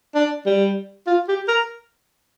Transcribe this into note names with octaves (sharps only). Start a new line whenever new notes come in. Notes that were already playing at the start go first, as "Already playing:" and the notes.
D4
G3
F4
G4
A#4